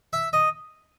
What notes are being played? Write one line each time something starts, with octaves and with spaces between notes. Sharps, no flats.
E5
D#5